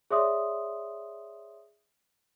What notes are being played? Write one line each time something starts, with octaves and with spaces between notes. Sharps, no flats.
G#4 C#5 D5 E5 C6 D#6